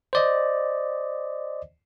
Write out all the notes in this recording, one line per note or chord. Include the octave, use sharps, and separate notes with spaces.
C5 D5 D#5